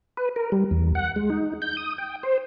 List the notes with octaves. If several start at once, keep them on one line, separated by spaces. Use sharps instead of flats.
B4
A#4
G3
E2
F#5
G#3
D#4
G6
D#6
G5
C5